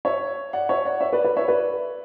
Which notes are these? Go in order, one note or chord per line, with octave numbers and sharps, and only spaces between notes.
C#5 E5
D5 F#5
C#5 E5
D5 F#5
C#5 E5
B4 D5
B4 D5
C#5 E5
B4 D5